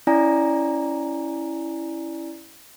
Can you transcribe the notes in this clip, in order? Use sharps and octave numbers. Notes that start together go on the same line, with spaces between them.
C#4 E4 D5 G#5 A#5